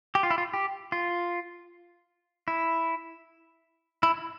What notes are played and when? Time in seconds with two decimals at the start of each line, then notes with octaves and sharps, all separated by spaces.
0.15 G4
0.23 F4
0.31 E4
0.38 F4
0.54 G4
0.92 F4
2.48 E4
4.03 E4